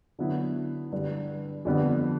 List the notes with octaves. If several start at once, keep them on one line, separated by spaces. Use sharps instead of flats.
D3 F#3 B3 E4
G2 D3 G3
F2 D3 G3 B3